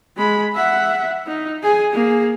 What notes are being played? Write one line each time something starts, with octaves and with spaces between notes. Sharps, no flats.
G#3 B5
E5 F#5
D#4
G#4 G#5
A#3 G#4